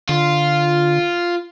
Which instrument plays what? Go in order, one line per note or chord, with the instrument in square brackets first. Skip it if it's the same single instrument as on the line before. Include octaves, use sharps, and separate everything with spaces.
[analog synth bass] D3 [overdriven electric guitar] F4